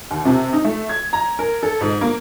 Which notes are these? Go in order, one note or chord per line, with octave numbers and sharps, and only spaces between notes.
D#2
C3
D#4
A3
G#6
A#5
A#4
A4
G#2
A#3